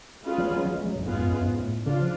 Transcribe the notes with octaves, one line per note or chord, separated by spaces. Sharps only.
G#3 C#4 F4 G#4 B4
F#3
F#3
F#3
G#3
F#3
A2
F#2
G#2 G#3 B3 F4 G#4
F#2
F#2
G#2
A2
C#3 D4 F4
F3